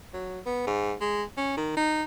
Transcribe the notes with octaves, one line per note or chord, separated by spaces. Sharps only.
F#3
B3
G#2
G#3
C#4
D#3
D#4